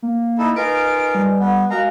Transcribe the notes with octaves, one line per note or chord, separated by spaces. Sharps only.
A#3
D#4 E4 A4
D#4 F4 A#4 B4 D#5 G#5 D7
G3
B3
G#3 F#4 A#4 D#5 F5 A#5